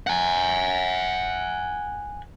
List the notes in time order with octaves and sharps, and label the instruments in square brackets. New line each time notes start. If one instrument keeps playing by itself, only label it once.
[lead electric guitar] F#5 G#5